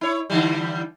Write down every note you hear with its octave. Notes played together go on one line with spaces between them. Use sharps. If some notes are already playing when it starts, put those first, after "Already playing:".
E4 C#5
D3 E3 G3